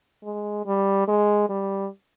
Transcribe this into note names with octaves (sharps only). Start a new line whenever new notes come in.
G#3
G3
G#3
G3